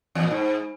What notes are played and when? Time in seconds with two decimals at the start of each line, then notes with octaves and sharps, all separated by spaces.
0.15 E2
0.23 A#2
0.31 G#2